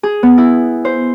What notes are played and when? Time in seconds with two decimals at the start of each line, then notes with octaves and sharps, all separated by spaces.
0.03 G#4
0.23 B3
0.38 E4
0.85 C5